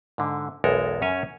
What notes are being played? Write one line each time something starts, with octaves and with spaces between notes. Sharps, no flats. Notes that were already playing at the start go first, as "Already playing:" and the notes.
G#2 D3
B1 E2 G#3 A4 A#4
F#2 C#4 C#5 G#5